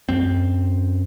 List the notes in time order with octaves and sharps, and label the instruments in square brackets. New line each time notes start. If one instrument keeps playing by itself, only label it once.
[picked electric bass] F#2 C4